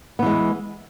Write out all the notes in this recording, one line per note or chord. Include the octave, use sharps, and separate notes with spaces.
E3 G#3 B3